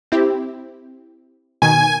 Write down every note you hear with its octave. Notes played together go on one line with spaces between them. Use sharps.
C4 E4 G4
B2 D#3 G#5